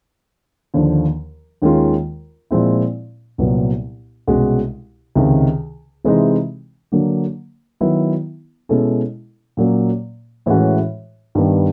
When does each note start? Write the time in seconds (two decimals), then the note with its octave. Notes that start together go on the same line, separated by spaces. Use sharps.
0.74 D#2 D3 F3
1.62 D#2 D#3 G#3 C#4 F4
2.51 A#2 F3 G#3 C4 E4
3.38 C2 A#2 F#3 B3
4.27 C2 B2 G#3 C#4 F#4
5.15 C#2 C3 D#3
6.04 C3 E3 G#3 C4 D#4
6.92 D3 F#3 A#3
7.81 D#3 F#3 B3 E4
8.69 B2 G#3 C#4 E4 A4
9.57 A#2 F#3 A#3 C#4
10.46 A2 E3 G#3 C#4 F#4
11.35 G2 D#3 G3 B3